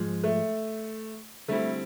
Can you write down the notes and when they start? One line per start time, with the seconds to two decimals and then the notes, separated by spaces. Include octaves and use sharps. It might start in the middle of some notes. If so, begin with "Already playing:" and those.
Already playing: G#2 F3 G#3
0.24 A3
1.48 D3 G3 A3 C4 E4